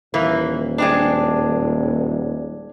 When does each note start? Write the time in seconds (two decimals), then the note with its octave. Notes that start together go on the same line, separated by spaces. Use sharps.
0.14 D#1 E3 A#3
0.78 G#3 C4 D4